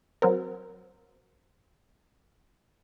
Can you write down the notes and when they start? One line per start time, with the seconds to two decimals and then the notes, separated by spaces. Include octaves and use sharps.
0.22 F#3 C4 A#4